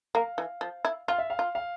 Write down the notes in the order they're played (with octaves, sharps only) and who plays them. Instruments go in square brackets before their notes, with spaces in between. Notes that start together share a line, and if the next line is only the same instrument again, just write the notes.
[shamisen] A#3 [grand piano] F5
[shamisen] E3
F3
E4
[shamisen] F4 [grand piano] F5
[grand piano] E5
F5
[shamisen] F4
[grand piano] F5